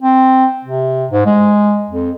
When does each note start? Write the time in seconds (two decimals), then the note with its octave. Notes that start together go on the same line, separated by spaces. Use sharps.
0.02 C4
0.65 C3
1.11 G#2
1.26 G#3
1.91 F2